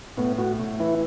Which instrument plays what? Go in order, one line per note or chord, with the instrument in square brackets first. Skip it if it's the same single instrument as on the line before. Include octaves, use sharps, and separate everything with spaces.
[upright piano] A2 [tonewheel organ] B3
[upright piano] A2 [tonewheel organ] F#4
[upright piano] A2
[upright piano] E3 [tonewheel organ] E4